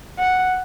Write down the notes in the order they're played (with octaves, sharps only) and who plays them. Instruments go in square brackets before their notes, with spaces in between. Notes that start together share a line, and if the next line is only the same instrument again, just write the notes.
[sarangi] F#5